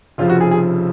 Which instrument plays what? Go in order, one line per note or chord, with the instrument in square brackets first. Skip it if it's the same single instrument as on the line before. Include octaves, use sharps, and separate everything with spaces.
[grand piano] F1 F2 C#3 F3 F4
F#4
G#4
G#4